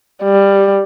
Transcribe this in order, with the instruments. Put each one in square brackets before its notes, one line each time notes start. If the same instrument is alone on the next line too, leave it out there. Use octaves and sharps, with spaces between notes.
[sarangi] G3